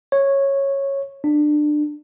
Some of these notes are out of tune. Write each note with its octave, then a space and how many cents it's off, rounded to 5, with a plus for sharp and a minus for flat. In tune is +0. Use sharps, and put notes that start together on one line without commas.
C#5 -10
D4 +25